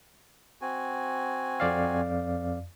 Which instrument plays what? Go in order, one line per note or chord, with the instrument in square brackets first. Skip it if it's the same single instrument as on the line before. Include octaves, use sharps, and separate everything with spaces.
[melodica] C4 F#4 G#5
[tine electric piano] F2 D5 F5